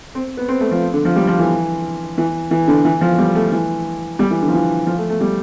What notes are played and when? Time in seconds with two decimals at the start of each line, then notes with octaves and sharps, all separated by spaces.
0.15 C4
0.37 B3
0.48 C4
0.60 A3
0.71 F3
0.94 D3
1.05 F3
1.16 G3
1.27 F3
1.39 E3
2.18 E3
2.51 E3
2.68 D3
2.85 E3
3.01 F3
3.18 G3
3.35 A3
3.52 E3
4.19 G3
4.31 E3
4.42 D3
4.48 F3
4.53 E3
4.87 F3
4.98 A3
5.10 A3
5.21 G3